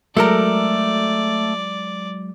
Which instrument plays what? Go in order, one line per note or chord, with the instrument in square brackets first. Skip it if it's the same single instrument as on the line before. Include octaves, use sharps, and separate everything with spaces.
[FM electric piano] F#3 G#3 [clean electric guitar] A3 [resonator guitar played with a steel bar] A4 A#4 A#5 [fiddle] D5